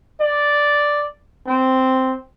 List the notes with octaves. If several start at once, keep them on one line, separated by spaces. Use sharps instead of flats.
D5
C4